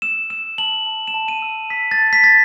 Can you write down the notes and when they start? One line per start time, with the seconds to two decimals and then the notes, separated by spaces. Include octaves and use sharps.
0.02 E6 E7
0.30 E6 E7
0.58 A5 F#7
0.86 A5
1.08 E7
1.14 A5
1.28 D#7
1.42 E6
1.70 E6 B6
1.91 A6
1.99 A5
2.13 B6
2.24 A5 A6